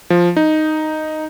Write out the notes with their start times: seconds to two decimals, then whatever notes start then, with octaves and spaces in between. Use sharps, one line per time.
0.10 F3
0.37 D#4